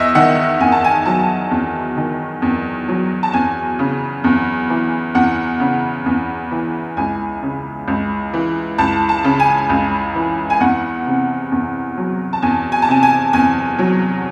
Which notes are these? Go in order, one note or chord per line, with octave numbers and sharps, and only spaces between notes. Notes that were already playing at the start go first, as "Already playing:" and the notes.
Already playing: E2 D#5 E5
D#3 F#5
E2 G#5
A5
G#5
F#3 A5
E2
D#3
E2
F#3
A5
E2 G#5
C#3
E2
E3
E2 F#5
C#3
E2
E3
C#2 G#5
C#3
C#2
E3
C#2 A5
A5
C#3
G#5
C#2
E3
G#5
E2 F#5
C3
E2
F#3
A5
E2 G#5
G#5
A5
C3 G#5
G#5
E2 G#5
F#3